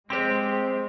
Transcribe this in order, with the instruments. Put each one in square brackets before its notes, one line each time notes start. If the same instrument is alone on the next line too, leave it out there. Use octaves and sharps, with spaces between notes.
[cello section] G#3 [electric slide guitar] C4 G4 [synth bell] C5 C6